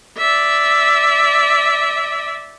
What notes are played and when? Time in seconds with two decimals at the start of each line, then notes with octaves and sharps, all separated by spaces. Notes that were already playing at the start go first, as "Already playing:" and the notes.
0.18 D5 E5